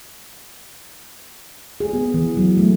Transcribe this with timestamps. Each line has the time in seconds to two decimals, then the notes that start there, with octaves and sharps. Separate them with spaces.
1.80 G#4
1.93 B3
2.14 E3
2.37 F#3
2.57 A3